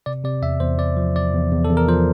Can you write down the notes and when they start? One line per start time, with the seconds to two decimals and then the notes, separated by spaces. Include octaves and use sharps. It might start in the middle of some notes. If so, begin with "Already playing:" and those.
0.06 C3 D5
0.24 C3 D5
0.42 E2 E5
0.60 E2 C5
0.79 E2 D5
0.97 F3
1.16 E2 D5
1.34 E2
1.52 E2
1.65 A4
1.70 E2
1.77 A#4
1.88 F3 C5